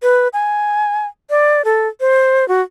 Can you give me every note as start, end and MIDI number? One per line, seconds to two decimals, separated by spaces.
0.03 0.28 71
0.33 1.07 80
1.30 1.64 74
1.65 1.88 69
2.00 2.47 72
2.48 2.61 66